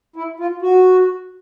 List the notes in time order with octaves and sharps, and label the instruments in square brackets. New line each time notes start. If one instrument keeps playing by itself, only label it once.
[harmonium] E4
F4
F#4